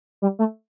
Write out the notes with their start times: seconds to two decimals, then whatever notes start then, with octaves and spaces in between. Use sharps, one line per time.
0.22 G3
0.39 A3